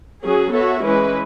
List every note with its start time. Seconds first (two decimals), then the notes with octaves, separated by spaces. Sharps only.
0.23 F#3 C#4 G#4
0.53 B3 F#4 A4 C#5 E5
0.83 E3 G#3 C#4 E4 B4